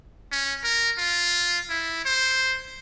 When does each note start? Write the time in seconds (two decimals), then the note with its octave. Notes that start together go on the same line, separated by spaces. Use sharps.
0.32 C#4
0.64 A#4
0.98 F4
1.69 E4
2.05 C5